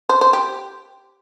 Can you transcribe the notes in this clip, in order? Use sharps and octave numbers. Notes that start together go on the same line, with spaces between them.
C5
C5
G4